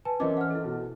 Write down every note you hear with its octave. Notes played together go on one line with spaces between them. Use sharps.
B4 G#5 A5
E3 C4 C#4 A#4 D#5 D6
F#5 F6
E4 A4
B2